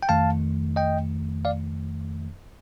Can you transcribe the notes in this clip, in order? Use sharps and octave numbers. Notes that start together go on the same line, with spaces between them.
G5
F2 D#3 A3 F5 A5
D#5 G5
D5 F5